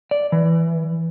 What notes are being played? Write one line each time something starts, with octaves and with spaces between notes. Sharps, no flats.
D5
E3